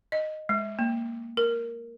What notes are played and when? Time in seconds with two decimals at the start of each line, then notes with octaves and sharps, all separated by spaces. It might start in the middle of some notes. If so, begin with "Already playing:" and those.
0.12 D#5
0.49 G#3
0.79 A#3
1.37 A#4